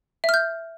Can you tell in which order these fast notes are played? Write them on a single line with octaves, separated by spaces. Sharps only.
E5 F6 G6